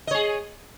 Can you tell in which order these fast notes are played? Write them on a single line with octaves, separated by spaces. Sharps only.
D#5 C#5 G#4